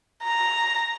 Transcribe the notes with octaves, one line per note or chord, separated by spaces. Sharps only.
A#5